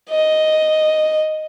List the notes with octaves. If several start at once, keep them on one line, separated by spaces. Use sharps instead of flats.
D#5